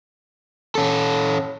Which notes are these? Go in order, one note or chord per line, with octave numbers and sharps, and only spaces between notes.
C#4 A4